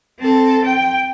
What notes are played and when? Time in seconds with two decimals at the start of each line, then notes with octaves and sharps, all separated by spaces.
0.20 C4 A4
0.65 G5